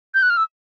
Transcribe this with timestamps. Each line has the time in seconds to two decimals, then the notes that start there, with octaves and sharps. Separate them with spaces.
0.14 G6
0.22 F#6
0.30 F6
0.37 E6